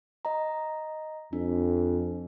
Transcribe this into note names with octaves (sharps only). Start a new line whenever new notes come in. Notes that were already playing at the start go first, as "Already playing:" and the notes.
D#5 A#5
F2 D4